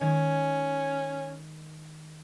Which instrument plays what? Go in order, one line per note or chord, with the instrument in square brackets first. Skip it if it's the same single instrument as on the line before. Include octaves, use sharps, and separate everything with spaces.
[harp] D#3 G#3 G#6 [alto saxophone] C#4